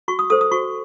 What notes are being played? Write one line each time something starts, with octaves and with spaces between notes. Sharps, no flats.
F#4 C#6
D#6
A4 C5 D#6
D#6
F#4 C#6